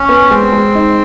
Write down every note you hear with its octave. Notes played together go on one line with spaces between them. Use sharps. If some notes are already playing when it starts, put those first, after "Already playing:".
Already playing: C#4
B3
G#3 C4
G#3
D#4